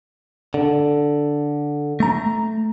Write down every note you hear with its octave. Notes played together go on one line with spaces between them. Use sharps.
D3
A3 A#5